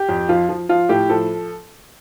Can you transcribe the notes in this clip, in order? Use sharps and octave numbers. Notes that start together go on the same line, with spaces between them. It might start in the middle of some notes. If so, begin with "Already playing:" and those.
Already playing: G4
F2
F3 F4
F3
F3 F4
A2 G4
F3 A4